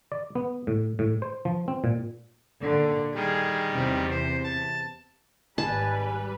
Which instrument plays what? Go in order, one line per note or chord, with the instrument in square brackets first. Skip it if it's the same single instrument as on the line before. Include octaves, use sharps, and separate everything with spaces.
[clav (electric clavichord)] D5
B3
A2
A2
C5
F3
C4
A#2
[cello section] A#2 D3
[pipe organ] D#3 G3 [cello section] G#4
[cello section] E2 C3
[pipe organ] C5
A5
[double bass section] G#1 [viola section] G3 B4 [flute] G#5 [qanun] A5